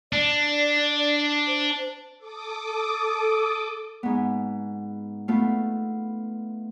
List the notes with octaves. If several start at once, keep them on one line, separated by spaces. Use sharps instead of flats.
D4 D5
C5
A4 D6 D#6
G#2 B3
A3 B3 F4